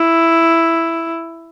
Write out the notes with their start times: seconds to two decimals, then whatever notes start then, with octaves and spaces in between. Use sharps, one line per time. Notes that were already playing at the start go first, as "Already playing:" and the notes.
Already playing: E4